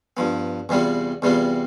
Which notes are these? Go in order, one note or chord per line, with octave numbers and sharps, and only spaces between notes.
G2 F3 B3
E2 C3 G3 B3 F4
E2 C3 G3 B3 F4